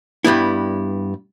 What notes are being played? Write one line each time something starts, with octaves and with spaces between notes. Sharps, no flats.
G2 G3 B3 E4